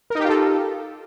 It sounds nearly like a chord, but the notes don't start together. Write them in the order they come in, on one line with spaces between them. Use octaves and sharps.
A#4 D#4 G4 F4 A4